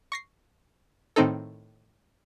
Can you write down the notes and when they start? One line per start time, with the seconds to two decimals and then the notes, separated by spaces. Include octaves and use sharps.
0.12 C#6 A#6 C7
1.16 A2 D#3 C4 D#4 A4